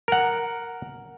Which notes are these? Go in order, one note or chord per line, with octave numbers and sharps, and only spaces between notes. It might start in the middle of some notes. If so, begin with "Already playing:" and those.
A#4 F#5